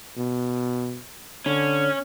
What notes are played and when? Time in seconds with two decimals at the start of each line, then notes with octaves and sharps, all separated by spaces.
0.17 B2
1.46 D3 C#4